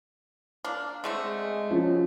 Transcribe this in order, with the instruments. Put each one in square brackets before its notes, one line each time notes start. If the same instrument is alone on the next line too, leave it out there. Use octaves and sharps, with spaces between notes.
[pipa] A#3 D4
[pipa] D3 A3 C4 [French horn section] G#3
[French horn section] G2 C#3 F#3 [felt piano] F3 C#4